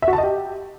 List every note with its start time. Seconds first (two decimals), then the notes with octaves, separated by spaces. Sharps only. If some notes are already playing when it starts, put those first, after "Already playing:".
0.02 E5
0.08 F#4
0.13 A5
0.18 D#5
0.23 G4